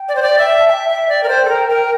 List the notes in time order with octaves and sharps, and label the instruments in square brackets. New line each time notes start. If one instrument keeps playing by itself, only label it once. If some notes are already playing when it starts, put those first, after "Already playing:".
Already playing: [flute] G5
[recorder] D5
C5
D5
E5
[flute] A5
[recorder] E5 [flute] G5
[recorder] E5
D5
A#4
C5
A4
A#4
A#4